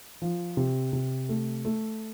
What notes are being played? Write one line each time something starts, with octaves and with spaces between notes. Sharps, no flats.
F3
C3
C3
A3
A3